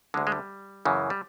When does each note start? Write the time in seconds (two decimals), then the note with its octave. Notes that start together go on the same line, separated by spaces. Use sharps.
0.14 D2 D3 G#3
0.27 G#3
0.32 G3
0.85 F#2 C#3 E3
1.10 G3